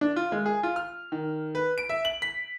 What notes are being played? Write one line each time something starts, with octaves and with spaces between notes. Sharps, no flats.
D4
F4
G#3
G#4
F4
F6
D#3
B4
D7
E5
F#7
B6